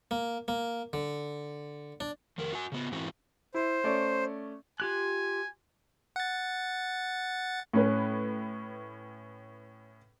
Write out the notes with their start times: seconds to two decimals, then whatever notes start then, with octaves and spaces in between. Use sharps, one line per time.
0.11 A#3
0.48 A#3
0.93 D3
2.00 D4
2.38 F2 D#3 A#4
2.53 F#4 G#5
2.72 C#3 B3
2.92 G#2 E3 C4 E4 F#4
3.54 E4 C5
3.84 A3 C#4 D5
4.80 F4 G4 G#5 F#6
6.16 F#5 A6
7.73 A2 C#4 B4